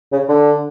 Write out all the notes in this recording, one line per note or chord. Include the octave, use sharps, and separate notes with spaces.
C#3
D3